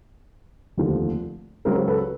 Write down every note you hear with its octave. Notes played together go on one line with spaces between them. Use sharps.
F1 D#2 D3 F3
C#2 C#3 F#3 A#4 C5
A4 B4